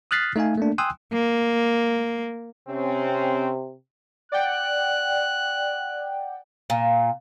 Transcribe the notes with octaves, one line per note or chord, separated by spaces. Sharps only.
D#6 F6 F#6 A6 B6 C7
A3 D#4 A4 F5 G#5
A3 A#3 D4
G5 G#5 C6 D#6 E6 F#6
A#3
C3 C4 C#4
D5 F#5 G5 F#6
A#2